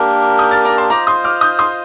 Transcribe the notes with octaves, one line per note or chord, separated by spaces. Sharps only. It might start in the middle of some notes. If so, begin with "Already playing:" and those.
Already playing: A#3 D4 G4 A#4
D#6 G6
F6 A6
A#5 D6
A5 C6
F4 C5 D#5 A#5 D6
C6 D#6
D6 F6
D#6 G6
C6 D#6